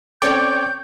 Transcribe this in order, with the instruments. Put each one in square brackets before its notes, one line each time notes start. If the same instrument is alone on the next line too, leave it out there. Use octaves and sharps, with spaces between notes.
[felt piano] C4 C#4 A4 [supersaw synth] C#5 D5 G5 [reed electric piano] D6 [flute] G6